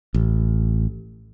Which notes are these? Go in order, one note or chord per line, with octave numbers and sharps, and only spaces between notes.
A1